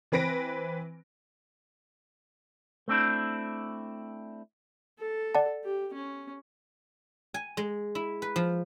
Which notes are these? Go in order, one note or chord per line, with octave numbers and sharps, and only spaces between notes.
E3 C4 B4 A#6 D7
A3 C4 D4 E4
A4
D5 F#5 A5
G4
C#4
G#5
G#3
E4
B4
F3